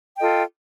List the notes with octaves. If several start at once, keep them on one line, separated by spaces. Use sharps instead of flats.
F4 A4 D#5 G5